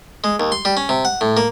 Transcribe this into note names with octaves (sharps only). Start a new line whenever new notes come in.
G#3
D#2
C6
G3
C#4
C3
F#5
A2
A#3